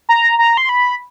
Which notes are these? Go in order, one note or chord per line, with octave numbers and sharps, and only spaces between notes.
A#5
A#5
C6
B5